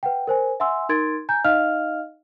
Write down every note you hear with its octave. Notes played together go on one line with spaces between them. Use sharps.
B4 F#5 G5
A#4 C5 G#5
E5 F#5 G#5 C6 E6
D#4 A#4 C6 G#6 A6 D7
G#5 A#5 G6
D#4 D#5 F5 F6 F7